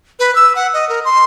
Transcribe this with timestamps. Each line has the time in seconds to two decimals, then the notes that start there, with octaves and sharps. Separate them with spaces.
0.19 B4
0.35 E6
0.56 F#5
0.74 D#5
0.89 A#4
1.05 C6